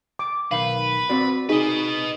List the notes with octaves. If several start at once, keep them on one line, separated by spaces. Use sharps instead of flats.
D6
B1 D#3 B4 F5
C4 F#4 D5
D#4 G#4 B4 D#5